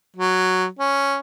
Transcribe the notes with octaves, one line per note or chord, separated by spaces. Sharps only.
F#3
C#4